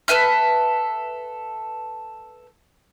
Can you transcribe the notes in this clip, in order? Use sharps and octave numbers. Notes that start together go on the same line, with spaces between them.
A4 B4 E5 F6